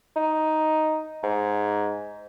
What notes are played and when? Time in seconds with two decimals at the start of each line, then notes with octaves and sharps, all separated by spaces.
0.16 D#4
1.23 G#2